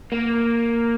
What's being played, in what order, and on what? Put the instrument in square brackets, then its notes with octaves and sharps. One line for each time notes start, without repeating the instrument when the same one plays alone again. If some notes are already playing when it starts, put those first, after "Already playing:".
[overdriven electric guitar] A#3